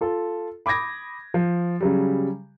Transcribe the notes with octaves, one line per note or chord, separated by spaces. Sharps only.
F4 A4
B5 D6 D#6 G#6 A#6
F3
C#3 F#3 G3